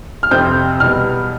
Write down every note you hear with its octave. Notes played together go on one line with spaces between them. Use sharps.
F6
F2 C3 F3 C4 G6
E2 B2 G3 B3 F6